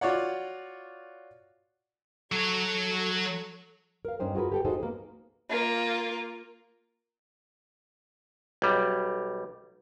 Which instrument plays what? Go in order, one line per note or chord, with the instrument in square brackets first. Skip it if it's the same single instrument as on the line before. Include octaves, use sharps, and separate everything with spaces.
[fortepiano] F4 F#4 C#5 D5 F#5
[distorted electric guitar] F#3 C#5 [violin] A4 C#6
[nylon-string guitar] A#4 F5
G2 C#4 D#4 C5 G5
F4 F#4 G#4 A#4 B4
G4 A4 G5
D#4 F4 F#4 G#4 A4 C5
A#3 B3
[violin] A#3 F4
[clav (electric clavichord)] B1 G3